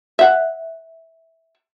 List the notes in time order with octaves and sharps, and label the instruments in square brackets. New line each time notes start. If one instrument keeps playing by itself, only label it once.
[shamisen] E5 F#5